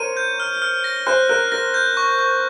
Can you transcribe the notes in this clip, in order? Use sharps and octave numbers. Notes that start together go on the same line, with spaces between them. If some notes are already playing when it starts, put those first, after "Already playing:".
Already playing: A#4 C5 C#5 D#7
G6
F6
F6
A#6
C5 F#6
A#4 F#6
A#4 A#6
G6
C#6
C#6